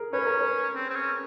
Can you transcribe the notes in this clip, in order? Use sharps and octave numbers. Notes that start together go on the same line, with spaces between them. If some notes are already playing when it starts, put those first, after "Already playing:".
Already playing: G#4 A#4
C#4 B4
A#4
B4
C4
C4
C#4